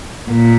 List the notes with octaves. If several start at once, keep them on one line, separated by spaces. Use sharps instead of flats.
A#2